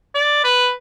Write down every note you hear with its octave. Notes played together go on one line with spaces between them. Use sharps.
D5
B4